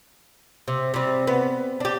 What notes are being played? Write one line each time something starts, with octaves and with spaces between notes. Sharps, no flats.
C3
C3 G3
B3
D4 G4